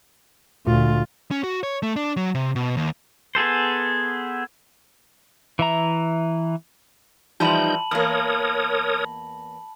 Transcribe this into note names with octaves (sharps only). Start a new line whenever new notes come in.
D2 A#2 F4
C#4
F#4
C#5
A3
D4
F#3
C3
B2
D#2
B3 G#4 A4 C5
E3 E5 A#5
E3 F3 G3 D#4 A5 B5 G6 F#7
E2 A#3 A#4 C#5 D#6